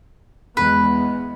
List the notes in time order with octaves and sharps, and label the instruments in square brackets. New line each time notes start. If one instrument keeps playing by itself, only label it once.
[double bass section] E2 G#3 B3 [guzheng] B4